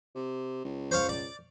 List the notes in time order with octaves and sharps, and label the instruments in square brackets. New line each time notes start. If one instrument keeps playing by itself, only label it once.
[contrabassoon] C3
C#2
[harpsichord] C5 C#5 F5
D5